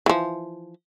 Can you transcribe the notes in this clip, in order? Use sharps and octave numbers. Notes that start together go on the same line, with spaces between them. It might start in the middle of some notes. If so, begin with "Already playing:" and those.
E3 F3